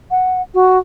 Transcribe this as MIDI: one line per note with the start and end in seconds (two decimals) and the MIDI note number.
0.11 0.42 78
0.54 0.78 66